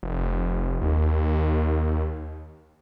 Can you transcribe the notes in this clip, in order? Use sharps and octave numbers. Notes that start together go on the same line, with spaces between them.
F1
D#2